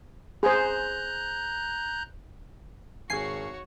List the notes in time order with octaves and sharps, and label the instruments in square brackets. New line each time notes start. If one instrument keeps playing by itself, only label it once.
[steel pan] G#4 C5 [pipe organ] A#5 F#6 G6
[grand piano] G#1 G#4 [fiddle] F#4 C#5 [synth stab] G#5 C7